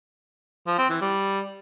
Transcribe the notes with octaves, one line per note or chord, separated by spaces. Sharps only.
F3
C4
E3
G3